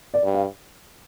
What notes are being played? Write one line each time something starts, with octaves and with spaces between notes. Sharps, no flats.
D5
G2
F5